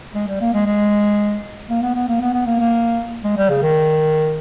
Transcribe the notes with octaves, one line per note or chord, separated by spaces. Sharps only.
G#3
G3
A#3
G#3
G#3
A#3
B3
B3
A#3
B3
B3
A#3
A#3
G#3
G3
C#3
D#3